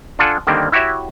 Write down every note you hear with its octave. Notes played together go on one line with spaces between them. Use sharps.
D4 F4 A4 F#5 G#5
D3 D#3 G3 A#3 C4
E4 F#4 G4 C#5 E5